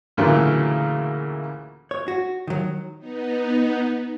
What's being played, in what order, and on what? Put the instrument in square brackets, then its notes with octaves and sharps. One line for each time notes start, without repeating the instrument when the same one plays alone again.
[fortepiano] D2 A#2 C#3 E3 F#3 A3
[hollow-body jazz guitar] C#5
F#4
D#3 F#3
[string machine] B3 D#4